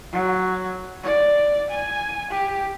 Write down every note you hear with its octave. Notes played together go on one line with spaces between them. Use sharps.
F#3
D5
G#5
G4